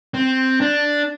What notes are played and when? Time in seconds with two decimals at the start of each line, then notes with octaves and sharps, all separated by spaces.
0.14 C4
0.61 D4